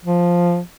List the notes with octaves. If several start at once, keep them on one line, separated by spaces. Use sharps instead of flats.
F3